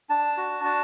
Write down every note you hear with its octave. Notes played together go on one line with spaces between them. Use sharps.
D4 A5
F#4
D4 A5